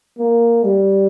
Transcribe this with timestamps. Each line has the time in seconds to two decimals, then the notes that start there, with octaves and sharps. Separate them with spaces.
0.19 A#3
0.64 G3